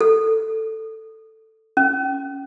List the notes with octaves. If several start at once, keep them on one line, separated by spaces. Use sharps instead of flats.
A4
C#4